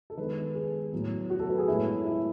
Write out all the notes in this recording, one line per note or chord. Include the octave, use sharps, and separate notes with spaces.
A4
D#3 G#3 B3 B4
G#4
A2 F#3 B3
F#4
A4
B4
G#4
A2 G#3 B3 E4
E4